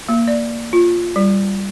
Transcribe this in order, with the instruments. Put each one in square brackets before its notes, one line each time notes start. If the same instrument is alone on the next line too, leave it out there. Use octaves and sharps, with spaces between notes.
[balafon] A#3
D5
F4
G3